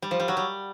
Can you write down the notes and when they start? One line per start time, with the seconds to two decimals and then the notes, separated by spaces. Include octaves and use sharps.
0.02 G3
0.11 F3
0.20 G3
0.28 F#3
0.37 G3